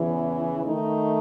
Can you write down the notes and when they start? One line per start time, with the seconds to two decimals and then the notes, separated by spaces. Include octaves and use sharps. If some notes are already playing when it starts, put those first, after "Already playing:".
Already playing: E2 C#3 E3
0.65 D#3 A3 D#4